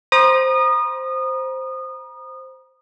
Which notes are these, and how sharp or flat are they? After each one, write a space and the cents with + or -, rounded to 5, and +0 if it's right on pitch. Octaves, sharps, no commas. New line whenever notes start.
C5 +0 A#5 +35 D#6 -25